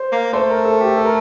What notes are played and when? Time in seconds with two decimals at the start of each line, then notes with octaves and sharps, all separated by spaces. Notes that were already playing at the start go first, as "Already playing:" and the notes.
Already playing: C5
0.12 A#3
0.33 A3 C5
0.50 A#4
0.65 A4
0.81 G4
0.97 A4
1.05 A#4